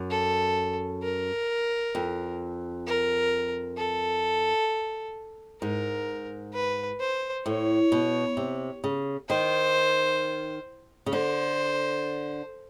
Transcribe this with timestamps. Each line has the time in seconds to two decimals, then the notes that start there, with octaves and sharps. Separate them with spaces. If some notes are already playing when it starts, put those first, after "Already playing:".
Already playing: F#2
0.10 A4
1.03 A#4
1.95 F2
2.87 A#4
3.78 A4
5.62 G#2 A#4
6.54 B4
7.00 C5
7.46 A2 C#5
7.92 B2
8.37 C3
8.84 C#3
9.29 D#3 C5
11.06 C#3
11.13 D3 C5